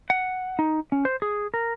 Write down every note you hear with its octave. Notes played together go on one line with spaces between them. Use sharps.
F#5
D#4
C#4
C5
G#4
A#4